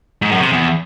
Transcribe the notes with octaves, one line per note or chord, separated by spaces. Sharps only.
G#2
F#2
C3
E2